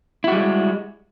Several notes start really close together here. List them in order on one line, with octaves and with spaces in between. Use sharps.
E4 F#4 G3 G#3